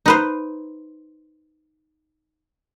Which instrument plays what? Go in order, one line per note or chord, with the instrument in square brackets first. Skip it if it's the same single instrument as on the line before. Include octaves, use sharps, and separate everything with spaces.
[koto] D#4 B4 C5